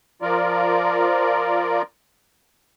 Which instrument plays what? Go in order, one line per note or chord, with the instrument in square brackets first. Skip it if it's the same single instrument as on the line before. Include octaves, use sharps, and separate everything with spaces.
[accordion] F3 F4 A#4 D5